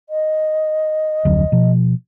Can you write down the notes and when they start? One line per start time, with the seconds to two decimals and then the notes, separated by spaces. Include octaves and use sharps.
0.09 D#5
1.25 F1 D2 F#3
1.52 B2 F3